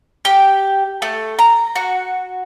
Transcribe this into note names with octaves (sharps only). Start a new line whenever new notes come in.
G4
A3
A#5
F#4